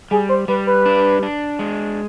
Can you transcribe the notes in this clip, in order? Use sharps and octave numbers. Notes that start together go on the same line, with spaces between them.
G3 G#4
C5
G3 B4
B4
D4
D4
G#3